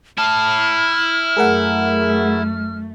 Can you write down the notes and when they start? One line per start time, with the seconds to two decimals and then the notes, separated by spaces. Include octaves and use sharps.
0.18 E4 A5 F6
1.37 F#2 A3 G#4 A#4 F#5